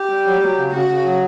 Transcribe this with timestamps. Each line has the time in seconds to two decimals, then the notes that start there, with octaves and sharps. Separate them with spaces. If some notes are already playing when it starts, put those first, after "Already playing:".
Already playing: G4
0.09 G3
0.26 F#3
0.41 F#3
0.57 C#3
0.72 C#3 F#4
0.88 C#3
1.04 F#3